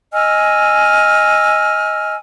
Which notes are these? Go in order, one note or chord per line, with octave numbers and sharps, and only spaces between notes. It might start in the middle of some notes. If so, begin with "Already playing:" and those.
D#5 G#5 E6 F6